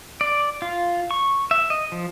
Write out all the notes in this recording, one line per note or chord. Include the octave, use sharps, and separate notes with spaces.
D5
F4
C#6
E5
D#5
F3